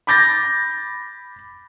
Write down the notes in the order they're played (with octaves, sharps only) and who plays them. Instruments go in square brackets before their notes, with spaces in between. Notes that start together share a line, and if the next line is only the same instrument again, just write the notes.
[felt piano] B5 D6 G6 A6 A#6